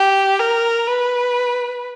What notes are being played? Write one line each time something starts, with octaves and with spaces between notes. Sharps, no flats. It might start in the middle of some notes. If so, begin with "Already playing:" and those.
Already playing: G4
A#4
B4